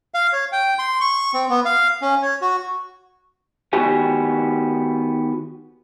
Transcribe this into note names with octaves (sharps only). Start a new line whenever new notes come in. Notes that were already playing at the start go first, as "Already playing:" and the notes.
F5
C#5
G5
C6
C#6
C4
B3
F5
C#4
C#5
F#4
D#3 B3 F#4 G4 G#5